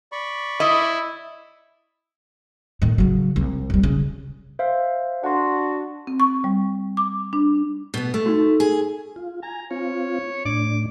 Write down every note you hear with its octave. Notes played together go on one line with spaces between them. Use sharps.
D5 B5 C#6
E4 D#5
A2 D#3
C#3 F#3
C2
F2 G3
C#3
C5 E5 F5
D4 F#4 F#5 C6
C4
C#6
G3
D6
D4
B2 B3
A3
D#4 F#4
G#4
F4
G#5 A#5
C4 F4 C#5
A2 D4 D6